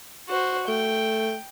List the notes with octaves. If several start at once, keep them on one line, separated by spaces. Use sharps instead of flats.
F#4 C5
A3 G5